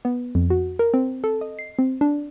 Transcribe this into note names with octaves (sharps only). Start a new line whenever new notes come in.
B3
F2
F#4
A#4
C4
A4
D#5
C7
C4
D4